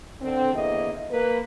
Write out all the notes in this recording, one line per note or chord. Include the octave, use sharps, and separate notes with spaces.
D3 C4
E2 D3 A#3 E4 D#5
A#3 B4